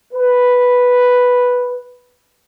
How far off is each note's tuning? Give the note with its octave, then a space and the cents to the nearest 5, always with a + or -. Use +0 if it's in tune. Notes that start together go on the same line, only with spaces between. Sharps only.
B4 +0